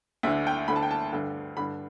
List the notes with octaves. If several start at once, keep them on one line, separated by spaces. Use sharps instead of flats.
D2 D3 E5
G5
D2 D3 B5
A5
G5
A5
G2 D3
G2 D3 B5